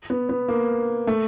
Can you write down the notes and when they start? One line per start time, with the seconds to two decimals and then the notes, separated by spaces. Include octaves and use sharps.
0.10 B3
0.29 B3
0.48 A#3
1.07 A3